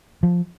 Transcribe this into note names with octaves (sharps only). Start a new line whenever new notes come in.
F3